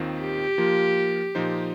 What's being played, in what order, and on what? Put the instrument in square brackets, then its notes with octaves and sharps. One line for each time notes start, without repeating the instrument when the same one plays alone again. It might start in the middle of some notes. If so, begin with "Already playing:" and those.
Already playing: [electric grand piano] D#2 D#3 C4 F4
[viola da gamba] G4
[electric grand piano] F3 A#3 F4
A#2 F3 D#4 C5